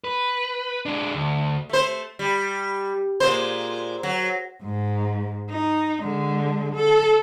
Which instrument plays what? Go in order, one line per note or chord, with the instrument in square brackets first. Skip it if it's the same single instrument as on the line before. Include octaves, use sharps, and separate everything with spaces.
[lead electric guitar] B4
G#3 D4
D2
[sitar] A3 C5
G3
A#2 G#3 C5
F#3
[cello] G#2
D#4
D3 G#3
A4